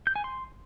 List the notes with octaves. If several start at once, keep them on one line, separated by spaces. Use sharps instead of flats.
G6
G#5
C6